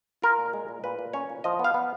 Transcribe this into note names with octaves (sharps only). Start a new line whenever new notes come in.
F4 A#4
A#2
G#3
A#2
A#2 B4
A#2
C#4 C#5
A#2
F3 D#5
B3
F5
B3